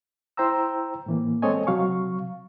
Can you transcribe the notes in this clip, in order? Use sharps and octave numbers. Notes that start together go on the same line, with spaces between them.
E4 C5 G5 A#5 E6
A2 E3 A#3
G#3 C4 A4 C#5 D#5 G#5
C3 F#3 F5 C#6